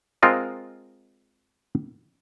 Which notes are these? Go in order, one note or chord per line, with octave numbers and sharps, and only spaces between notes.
G#3 C4 F4 A#4 D#5